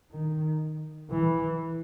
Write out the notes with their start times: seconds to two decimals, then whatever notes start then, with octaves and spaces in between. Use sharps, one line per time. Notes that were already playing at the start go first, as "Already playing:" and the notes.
0.11 D#3
1.11 E3